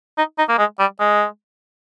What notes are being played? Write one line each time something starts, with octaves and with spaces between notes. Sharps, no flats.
D#4
D#4
A#3
G#3
G3
G#3